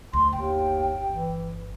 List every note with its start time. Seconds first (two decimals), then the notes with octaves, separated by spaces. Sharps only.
0.13 D2 C6
0.33 G1 D#2 G5
1.10 E3